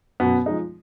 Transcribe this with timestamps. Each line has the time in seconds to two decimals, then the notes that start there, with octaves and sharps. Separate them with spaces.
0.20 F#2 B2 B3
0.46 F3 G#3 D#4